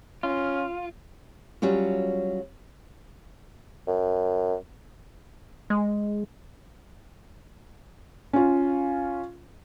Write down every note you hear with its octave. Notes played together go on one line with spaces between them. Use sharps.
C#4 F4
F#3 G3 C#4 F4
F#2
G#3
C#4 F4